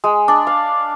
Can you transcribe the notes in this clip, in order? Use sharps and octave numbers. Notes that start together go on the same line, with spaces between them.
G#3
D4
F5